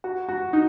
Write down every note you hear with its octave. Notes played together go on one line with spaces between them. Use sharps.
F#4
F#4
D#4